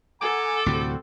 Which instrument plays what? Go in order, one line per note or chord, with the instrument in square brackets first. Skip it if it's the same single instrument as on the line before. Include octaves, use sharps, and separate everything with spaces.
[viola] A4 [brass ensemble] F#5 G#5 A#5 [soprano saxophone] D6
[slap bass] D2 A2 C3 [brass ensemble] G3 C4 F#4